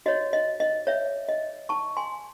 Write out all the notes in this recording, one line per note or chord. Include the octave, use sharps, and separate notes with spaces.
F#4 C#5 D#5
D#5
D#5
C#5 E5
D#5
A5 C#6
G#5 C6